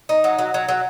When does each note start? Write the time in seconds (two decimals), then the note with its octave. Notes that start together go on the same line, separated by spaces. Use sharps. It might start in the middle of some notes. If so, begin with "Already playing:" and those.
0.09 D#4
0.24 F#3
0.38 F#3
0.54 F#3
0.69 F#3